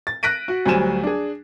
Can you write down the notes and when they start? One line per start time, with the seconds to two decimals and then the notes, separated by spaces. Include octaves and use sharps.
0.07 A6
0.23 F#6 A#6 B6 D7 D#7
0.48 F#4
0.66 D2 F#3 G3 C5 G#5 E7
1.03 D4 G#4